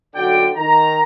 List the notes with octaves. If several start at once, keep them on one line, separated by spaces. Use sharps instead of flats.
B1 D3 F#3 D5 G5
D#3 A#5